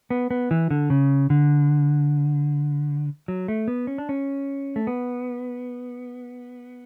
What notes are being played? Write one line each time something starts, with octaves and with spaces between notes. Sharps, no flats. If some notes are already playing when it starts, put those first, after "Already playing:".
B3
B3
E3
D3
C#3
D3
F#3
A3
B3
C#4
D4
C#4
A3
B3